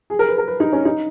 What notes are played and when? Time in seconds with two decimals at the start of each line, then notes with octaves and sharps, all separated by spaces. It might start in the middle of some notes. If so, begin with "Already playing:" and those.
0.10 G#4
0.19 A#4
0.29 B4
0.38 A#4
0.48 B4
0.60 D#4
0.73 C#4
0.85 D#4